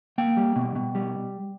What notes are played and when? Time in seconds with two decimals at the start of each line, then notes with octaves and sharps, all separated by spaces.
0.18 A#3 G5
0.37 G3
0.56 B2
0.75 B2
0.95 G3